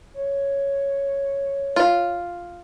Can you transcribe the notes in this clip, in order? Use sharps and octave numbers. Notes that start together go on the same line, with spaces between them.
C#5
F4